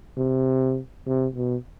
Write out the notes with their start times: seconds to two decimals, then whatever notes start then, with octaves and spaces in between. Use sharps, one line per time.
0.17 C3
1.06 C3
1.35 B2